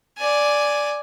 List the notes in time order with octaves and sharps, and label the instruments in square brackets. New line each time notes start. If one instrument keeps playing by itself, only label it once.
[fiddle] D5 G#5